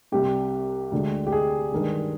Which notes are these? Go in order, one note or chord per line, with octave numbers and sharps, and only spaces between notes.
C2 C3 G3 G4
D2 D3 G#3
G4
G#4
G2 D#3 G#3